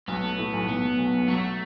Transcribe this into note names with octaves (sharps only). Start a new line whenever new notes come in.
B1 B3
A3
A2
B1
B1 B3
A3
B1
B1
F#3 A3